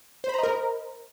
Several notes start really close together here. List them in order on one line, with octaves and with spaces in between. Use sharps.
C5 B5 A#5 D#5 A#4